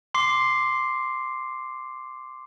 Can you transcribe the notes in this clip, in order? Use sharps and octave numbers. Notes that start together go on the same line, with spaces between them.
C6 D6 C7